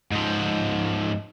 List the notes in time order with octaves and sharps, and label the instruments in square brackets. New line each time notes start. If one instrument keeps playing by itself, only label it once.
[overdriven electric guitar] G#2 F3